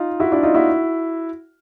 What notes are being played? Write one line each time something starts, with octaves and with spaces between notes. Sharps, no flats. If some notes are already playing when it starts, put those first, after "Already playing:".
Already playing: D#4 F4
E4 F#4
D4 E4
D#4 F4
E4 F#4